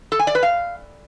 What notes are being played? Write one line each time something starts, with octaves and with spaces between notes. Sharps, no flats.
A4
G#5
D5
B4
F5